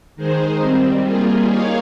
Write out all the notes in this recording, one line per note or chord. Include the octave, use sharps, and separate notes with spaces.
D#3 G#3 D#4 G#4 C5
D#3 G3 C4
G3 A#3 F4 G#4
A#3 D#4 G#4 C#5 F5